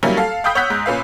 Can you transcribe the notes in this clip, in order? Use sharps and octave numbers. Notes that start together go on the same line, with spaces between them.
F#3 G3 A#3 C#4 E4
A4 F5
F5 G5 B5 D#6 G6 B6
C#5 F#5 E6 F#6 G6 B6
G#2
A#2 C#4 B4 F5